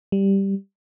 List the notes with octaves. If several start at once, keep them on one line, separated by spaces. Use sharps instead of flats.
G3